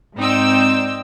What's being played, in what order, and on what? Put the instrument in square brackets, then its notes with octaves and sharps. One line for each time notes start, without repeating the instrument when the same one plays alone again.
[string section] G#2 C4 D#4 D5 G5 E6